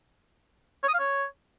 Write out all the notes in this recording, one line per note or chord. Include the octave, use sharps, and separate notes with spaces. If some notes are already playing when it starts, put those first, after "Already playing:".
C#5
D#6
F5
C#5